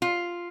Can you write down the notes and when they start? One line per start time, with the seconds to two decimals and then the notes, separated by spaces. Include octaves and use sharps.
0.02 F4